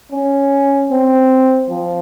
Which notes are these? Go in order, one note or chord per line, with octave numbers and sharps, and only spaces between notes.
C#4
C4
F3